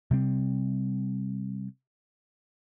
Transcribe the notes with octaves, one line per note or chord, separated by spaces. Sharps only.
C3 G3 C4